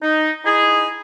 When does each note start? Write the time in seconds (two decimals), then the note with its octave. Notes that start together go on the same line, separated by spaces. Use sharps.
0.02 D#4
0.44 D#4 E4 G#4